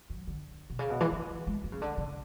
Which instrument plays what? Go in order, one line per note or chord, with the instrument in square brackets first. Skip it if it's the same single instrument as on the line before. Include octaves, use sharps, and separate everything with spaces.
[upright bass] F#3
D3
B2
C#3
B2
E3
E3
E3
G#3
F#3
C#3
D3
C#3